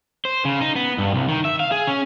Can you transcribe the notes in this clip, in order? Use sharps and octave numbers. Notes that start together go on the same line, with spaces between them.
C5
C#3
D#4
B3
G2
C2
D#3
E5
F5
G#4
C#4